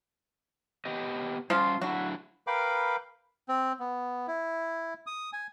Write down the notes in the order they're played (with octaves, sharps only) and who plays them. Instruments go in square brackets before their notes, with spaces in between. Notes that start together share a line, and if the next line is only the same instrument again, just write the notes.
[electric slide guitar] B3 G4 D#5
[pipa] F3 F4 [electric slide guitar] G3 C#4
[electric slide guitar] F#3 D4 E4 [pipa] F#4
[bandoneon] A#4 B4 F5 G5 B5 D6
[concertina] C4
B3
E4
D#6
G#5